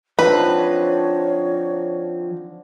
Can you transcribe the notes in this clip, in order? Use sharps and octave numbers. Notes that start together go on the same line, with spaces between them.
D3 F3 C4 D#4 B4 C#5